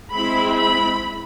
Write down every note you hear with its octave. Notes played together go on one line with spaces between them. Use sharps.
G#3 C4 E4 B5
B5